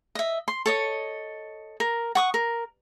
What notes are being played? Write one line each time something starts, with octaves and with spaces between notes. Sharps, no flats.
D#5 E5
C6
A4 C#5 D#5
A#4
F#5 C#6 D#6
A#4